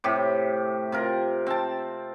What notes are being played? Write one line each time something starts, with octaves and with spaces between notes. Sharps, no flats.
A2 C3 G4
C3 F4 A#4
C4 G5 A5